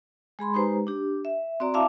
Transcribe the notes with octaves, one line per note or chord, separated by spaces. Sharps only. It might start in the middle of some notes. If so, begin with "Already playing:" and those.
G#3 G#4 B5 C6
G#3 D#4 G4 B4 C5 A#5
D4 G4
E5
C4 F#4 D5 A#5
E4 E5 F5 A5 D6